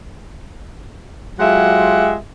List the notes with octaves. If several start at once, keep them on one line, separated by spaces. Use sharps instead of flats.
F#3 G#3 F4 G4 E5 F#5